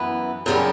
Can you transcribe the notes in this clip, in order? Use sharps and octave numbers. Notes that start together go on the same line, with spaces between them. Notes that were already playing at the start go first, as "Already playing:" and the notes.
Already playing: F#2 E3 B3
F#2 C#3 G3 C#4